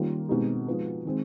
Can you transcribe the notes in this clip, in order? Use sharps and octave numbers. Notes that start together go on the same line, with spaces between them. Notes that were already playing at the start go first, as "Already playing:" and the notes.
Already playing: D#3 G3 A#3 C#4 F4
B2 G#3 C4 D#4 G4
F3 G#3 B3 D#4
D#3 G#3 C4